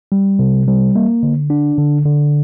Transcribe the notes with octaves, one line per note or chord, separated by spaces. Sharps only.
G3
C3
G3
A#3
D3
D4
D3
D3